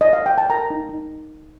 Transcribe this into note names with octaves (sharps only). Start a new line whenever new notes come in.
D#5
F5
G5
A5
A#4 A#5
D#4
D#4